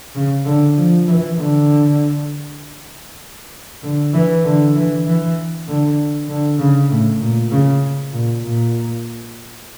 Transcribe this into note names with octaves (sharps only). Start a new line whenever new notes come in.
C#3
D3
F3
E3
D3
D3
E3
D3
E3
E3
D3
D3
C#3
A2
A#2
C#3
A#2
A#2